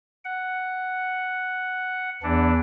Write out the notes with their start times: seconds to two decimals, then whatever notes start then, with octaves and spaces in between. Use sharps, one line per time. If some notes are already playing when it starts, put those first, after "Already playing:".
0.25 F#5
2.23 E2 E3 D4